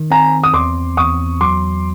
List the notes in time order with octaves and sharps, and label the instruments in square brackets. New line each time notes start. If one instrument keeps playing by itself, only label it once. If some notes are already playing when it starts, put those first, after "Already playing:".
Already playing: [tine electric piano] D#3
[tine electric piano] C4 [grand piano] G#5 A#5
[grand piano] D#6
[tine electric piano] E2 [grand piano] C6 D6
[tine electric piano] E2 [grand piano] C#6 D#6
[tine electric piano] F#3 [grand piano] C6 D6